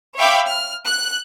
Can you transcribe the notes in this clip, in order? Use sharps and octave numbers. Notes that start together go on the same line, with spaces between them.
C#5 E5 F5 G5 B5 D6
F6
F#6